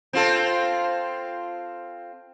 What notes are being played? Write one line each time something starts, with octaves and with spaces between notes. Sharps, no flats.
C4 F4 A4